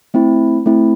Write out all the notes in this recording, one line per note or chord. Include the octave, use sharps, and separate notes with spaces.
A3 C4 E4
A3 C4 E4